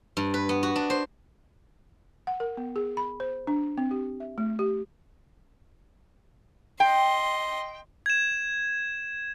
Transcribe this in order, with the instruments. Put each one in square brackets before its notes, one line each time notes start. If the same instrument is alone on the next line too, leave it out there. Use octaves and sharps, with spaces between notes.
[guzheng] G2
B4
B3
F#4
D4
C5
[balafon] F#5
A#4
B3
G#4
B5
C5
D4
C4
G4
E5
A3
G4
[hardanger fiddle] D#5 C6 [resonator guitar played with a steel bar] G5
[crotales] G#6 E7